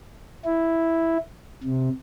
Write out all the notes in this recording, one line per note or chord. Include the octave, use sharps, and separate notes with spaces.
E4
C3